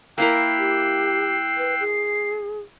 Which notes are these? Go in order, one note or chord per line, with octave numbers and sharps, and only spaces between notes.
A#3 E4 A#4 G5 E6 F#6 C7
G4
B4
G#4